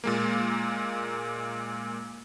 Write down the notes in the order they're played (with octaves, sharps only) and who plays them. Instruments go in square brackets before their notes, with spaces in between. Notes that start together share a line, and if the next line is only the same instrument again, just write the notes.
[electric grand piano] A#2 G#3 A#3